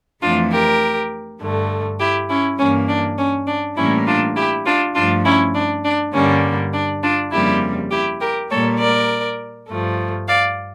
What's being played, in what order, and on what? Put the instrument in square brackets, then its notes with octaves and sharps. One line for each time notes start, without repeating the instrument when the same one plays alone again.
[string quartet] F2 E3 A3 D4 F4
G4 A#4
G2 D3 A3
E4 G4
C#4 E4
G2 E3 A#3 C#4
D4
C#4
D4
A2 E3 G3 A#3 C#4 E4
D4 F4
E4 G4
D4 F4
G2 F3 A3 D4 F4
C#4 E4
D4
D4
G2 D3 G3 A#3 C#4
D4
D4 F4
F2 C#3 G3 A#3 E4 G4
E4 G4
G4 A#4
A#2 G3 A#3 A4 C#5
A#4 D5
G2 F3 A3
D5 F5